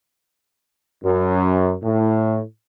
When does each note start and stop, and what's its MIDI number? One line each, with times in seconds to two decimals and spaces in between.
1.03 1.74 42
1.82 2.40 45